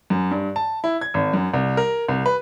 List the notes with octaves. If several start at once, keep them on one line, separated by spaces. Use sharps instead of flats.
F#2
G2
A5
E4
G#6
G#1
F#2
C2
A#4
C2
B4